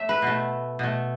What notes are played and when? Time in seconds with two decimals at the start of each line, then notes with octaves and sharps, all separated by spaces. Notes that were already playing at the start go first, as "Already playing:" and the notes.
Already playing: A3 E5
0.09 B4
0.22 B2 A3
0.79 B2 A3